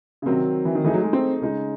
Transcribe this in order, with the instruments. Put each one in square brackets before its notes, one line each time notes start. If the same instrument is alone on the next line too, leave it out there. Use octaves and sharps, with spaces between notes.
[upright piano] C#3
[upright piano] C3 [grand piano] D#3 F#3 C4
[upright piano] E3
D#3
[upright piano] E3 [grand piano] A3 D#4 G#4
[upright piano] F#3
G#3
C4
[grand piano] C#3 G#3 D#4